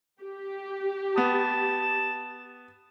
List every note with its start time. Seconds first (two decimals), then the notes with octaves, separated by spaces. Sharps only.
0.22 G4
1.16 B3 A5 D#6